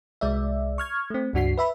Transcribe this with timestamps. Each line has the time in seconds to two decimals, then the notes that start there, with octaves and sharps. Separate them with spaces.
0.21 C2 G#3 D5 E5
0.78 C#6 F6 G#6
1.10 A3 C4
1.33 C#2 G2 D4 F#4 B6 C7
1.57 B4 E5 B5